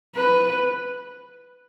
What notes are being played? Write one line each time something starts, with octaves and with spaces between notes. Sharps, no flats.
B4